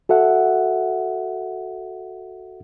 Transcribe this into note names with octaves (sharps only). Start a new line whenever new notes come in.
F#4 A4 E5 F#5